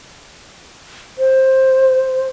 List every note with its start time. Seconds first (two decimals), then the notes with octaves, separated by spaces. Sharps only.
1.18 C5